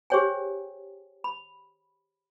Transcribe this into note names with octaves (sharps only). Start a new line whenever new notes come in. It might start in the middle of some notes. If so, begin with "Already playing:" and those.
G4 G#4 C5 C#5 G5 G#5
B5